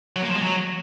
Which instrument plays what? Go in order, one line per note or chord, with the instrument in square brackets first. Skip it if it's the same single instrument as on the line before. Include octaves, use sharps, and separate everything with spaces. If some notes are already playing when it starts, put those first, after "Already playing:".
[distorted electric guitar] F#3
A#3
F3
G#3
F#3